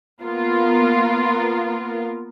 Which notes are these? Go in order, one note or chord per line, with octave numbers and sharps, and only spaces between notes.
A#3 B3 F4 A#4